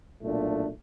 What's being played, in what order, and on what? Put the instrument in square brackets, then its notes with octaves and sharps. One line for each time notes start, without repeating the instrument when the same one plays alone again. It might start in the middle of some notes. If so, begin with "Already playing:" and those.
[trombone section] B1 A#2 A3 D4